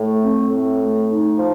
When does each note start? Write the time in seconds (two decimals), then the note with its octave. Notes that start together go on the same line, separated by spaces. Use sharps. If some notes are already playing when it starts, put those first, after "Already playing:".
Already playing: A2 A3
0.21 C4
0.50 A2
0.79 A3
1.08 D#4
1.37 F3